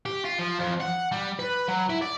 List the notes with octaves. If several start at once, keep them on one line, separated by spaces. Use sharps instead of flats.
G4
F4
F3
F2
F#5
G3
B4
F#3
E4
D5